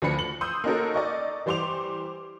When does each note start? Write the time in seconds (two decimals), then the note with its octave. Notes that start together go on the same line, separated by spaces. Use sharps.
0.02 D2 F3 D4 B4 B5 C#7
0.19 F#7
0.41 C6 D#6 E6 G6
0.64 A#3 C#4 D#4 F#4 A4 A#4
0.94 D5 D#5 C#6
1.46 E3 G3 C5 C6 D6 F7